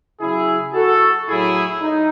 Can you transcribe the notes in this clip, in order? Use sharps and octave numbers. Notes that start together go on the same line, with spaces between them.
C#3 F#3 E4 G#4
F#4 A4
A2 F#3 E4 G#4
D#4